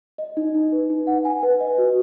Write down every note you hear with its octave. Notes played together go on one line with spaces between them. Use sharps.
D#5
D#4
D#4
B4
D#4
F#5
G#5
B4
D#5
F#4